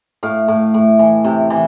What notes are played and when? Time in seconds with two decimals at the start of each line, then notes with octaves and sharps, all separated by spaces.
0.23 A2 F5
0.48 A2
0.74 A2
0.99 E3
1.24 C3
1.50 E3